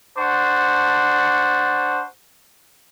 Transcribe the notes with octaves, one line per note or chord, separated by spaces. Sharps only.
D4 C5 F#5 A5 C#6